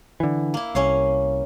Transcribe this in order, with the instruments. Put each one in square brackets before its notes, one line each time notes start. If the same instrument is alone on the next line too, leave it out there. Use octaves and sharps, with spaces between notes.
[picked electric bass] D3 E3
[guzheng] A#3 E4
[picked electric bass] C2 [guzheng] C#4 C#5 F5